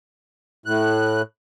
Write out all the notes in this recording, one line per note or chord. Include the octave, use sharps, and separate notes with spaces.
A2 F#6